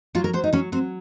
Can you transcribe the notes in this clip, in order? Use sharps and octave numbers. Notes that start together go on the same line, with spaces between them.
F#3 F4
A#4
F#3 C5
D#4
F#3 C#4
F#3 C4